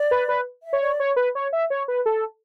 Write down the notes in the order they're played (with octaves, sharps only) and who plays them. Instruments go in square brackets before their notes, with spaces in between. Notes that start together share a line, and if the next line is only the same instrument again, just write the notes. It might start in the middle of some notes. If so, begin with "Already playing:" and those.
Already playing: [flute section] D5
[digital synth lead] B4
B4
[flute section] E5
[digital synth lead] C#5
[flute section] D5
[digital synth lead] C#5
B4
C#5
E5
C#5
B4
A4